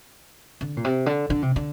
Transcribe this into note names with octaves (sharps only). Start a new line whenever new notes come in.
D3
A#2
C3
D3
D3
C3
D3